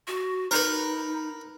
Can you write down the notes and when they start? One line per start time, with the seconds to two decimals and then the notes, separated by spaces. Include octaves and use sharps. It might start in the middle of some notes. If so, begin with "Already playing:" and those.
0.07 F#4
0.51 D#4 A#4 B4